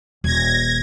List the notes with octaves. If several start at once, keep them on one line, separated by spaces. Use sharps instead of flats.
D#1 G#6 A#6